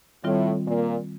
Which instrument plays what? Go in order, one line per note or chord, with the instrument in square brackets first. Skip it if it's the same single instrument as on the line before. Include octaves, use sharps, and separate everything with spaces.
[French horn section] A2 [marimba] D#3 G3 C4 F4
[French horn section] A#2